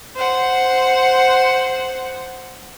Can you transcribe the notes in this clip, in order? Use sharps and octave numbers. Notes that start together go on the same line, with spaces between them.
C5 F#5